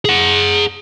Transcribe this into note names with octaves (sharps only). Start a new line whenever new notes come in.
G#4 F#5